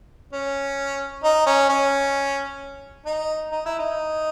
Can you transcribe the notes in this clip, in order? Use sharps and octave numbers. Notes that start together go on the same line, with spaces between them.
C#4
D#4
C#4
C#4
D#4
D#4
E4
D#4